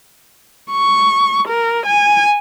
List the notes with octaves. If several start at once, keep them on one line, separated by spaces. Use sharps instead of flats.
C#6
A#4
G#5